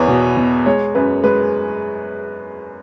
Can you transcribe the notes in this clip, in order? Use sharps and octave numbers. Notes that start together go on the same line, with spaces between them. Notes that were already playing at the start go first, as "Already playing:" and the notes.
Already playing: E2 B3 G#4 B4 C#5
B2
B2
G#3 C#5
F#2 B4
G#3 B4